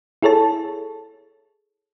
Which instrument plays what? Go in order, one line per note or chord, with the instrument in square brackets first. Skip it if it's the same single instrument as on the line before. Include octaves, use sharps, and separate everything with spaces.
[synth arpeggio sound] E4 G#4 A4 C#5 A5